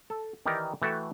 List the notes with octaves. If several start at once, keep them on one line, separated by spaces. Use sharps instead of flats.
A4
D#3 E3 D#4 G4 A#4 D5
E3 A3 F#4 A4 E5 G5